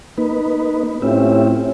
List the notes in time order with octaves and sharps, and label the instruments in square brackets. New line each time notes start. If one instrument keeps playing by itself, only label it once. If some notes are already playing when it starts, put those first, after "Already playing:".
[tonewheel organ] A#3 D#4 B4
[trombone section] A2 C4 C#4 [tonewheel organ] F4 G4 E5